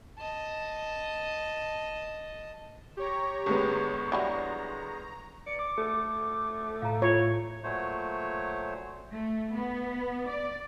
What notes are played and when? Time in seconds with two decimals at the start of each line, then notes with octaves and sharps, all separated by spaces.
0.18 D#5 A5
2.97 G4 C#5 A#5 C#6
3.46 G1 G#3 B3
4.12 E3 F#3 G3 A#5
5.46 D5 C#7
5.59 D6
5.78 A3 A4
6.82 A2 F5 A#5
7.02 F4 C#5
7.64 A#2 F#3 A3 C5 C#5
9.11 A3
9.54 B3
10.28 D5